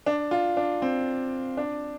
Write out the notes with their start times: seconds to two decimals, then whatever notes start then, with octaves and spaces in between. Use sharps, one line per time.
0.06 D4
0.31 F4
0.57 D4
0.82 C4
1.57 D4